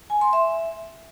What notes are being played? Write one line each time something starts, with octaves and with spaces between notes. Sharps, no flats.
G#5
C6
E5